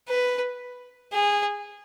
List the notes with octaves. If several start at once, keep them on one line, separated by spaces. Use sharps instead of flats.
B4
G#4